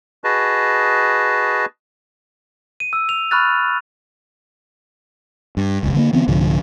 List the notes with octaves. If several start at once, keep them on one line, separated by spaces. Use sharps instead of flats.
F#4 G#4 B4 D#5 A5
D#7
E6
F7
B5 C#6 F6 F#6 A6
G2
F1 C#2
D3 A3 A#3
D3 E3 B3 C4
C2 G#2 D3 F3